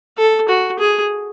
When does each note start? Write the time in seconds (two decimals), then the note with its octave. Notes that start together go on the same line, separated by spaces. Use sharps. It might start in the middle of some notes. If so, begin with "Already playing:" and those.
0.18 A4
0.49 F#4
0.79 G#4